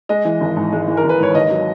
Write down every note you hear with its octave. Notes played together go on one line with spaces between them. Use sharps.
G#3 D#5
E3
G#1
G#2
G#3
E3
A#4
G#1
B4
G#2 C#5
D#2 D#5
F#3